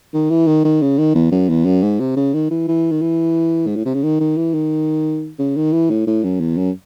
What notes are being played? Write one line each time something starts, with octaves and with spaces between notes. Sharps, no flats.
D#3
E3
D#3
D#3
C#3
D#3
E2
F#2
E2
F#2
G#2
C3
C#3
D#3
E3
E3
D#3
E3
G#2
A2
C3
C#3
D#3
D#3
E3
D#3
C#3
D#3
E3
A2
A2
F#2
E2
F#2